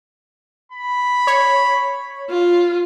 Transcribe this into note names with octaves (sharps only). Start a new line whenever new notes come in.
B5
C#5
F4